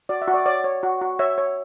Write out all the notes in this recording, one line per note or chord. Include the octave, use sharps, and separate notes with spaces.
F#4 D5
E5
F#4
D5
C#5 D5
C#5
F#4
F#4
C#5 E5
C#5